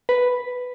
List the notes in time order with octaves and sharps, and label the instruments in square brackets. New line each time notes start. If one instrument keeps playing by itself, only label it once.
[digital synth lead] B4